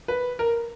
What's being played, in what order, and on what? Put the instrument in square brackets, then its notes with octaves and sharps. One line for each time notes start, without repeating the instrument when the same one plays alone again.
[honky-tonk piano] B4
A#4